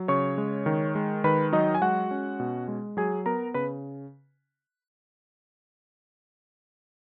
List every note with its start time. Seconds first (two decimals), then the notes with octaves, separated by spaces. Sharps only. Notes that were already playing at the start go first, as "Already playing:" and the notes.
Already playing: F#3
0.08 C#3 C#5 C#6
0.38 G#3
0.66 D#3
0.95 G#3
1.24 D#3 B4 B5
1.53 F#3 D#4 D#5
1.75 G#5
1.81 G#3 F#4 F#5
2.11 C#4
2.40 B2
2.68 G#3
2.97 F#3 G#4 G#5
3.26 B3 A#4 A#5
3.54 C#3 B4 B5